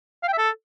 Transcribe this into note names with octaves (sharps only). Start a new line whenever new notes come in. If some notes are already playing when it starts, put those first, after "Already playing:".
F5
G5
E5
A4